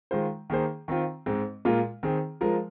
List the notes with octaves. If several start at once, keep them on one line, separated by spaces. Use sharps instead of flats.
D#3 G#3 F4 C5
D#3 A#3 G#4 C5
D#3 C4 F4
G#2 G#3 C4
A#2 G#3 F4 A#4
D#3 C4 G#4
F3 G#3 F4 A#4